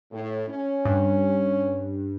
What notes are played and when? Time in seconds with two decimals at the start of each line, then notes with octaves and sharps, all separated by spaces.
0.12 A2
0.50 C#4
0.85 G2